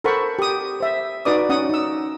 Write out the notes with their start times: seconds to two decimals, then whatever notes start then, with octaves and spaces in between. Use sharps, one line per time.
0.04 A4 A#4 C5 F#5 B5 C#6
0.39 G4 D#6
0.80 C5 E5
1.25 D#4 F#4 B4 D5 D6 D#6
1.49 C#4 F#5 D#6
1.69 D#4 E6